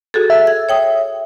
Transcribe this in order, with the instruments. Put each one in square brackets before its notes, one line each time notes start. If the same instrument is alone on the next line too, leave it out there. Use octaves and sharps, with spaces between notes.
[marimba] F#4 G#4 A4
[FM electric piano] E5
[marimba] G#6
C#5 G5 D#6